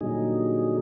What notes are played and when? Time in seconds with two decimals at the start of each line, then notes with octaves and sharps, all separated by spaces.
0.01 A#2 D3 F#3 G3 D#4 G#4